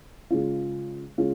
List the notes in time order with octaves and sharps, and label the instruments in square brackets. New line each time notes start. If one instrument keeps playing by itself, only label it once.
[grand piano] C#3 G#3 C#4 F4
C#3 G#3 C#4 F4